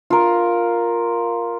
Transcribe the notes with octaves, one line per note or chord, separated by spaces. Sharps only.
F4 A#4